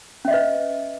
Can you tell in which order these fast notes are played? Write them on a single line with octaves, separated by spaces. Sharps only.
C#4 E5 D#5 B4